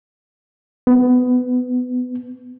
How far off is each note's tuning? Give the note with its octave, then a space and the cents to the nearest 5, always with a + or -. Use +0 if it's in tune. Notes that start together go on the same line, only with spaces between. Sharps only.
B3 +20